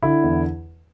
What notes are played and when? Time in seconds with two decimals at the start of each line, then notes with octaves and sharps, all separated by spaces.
0.03 D3 E4
0.24 E2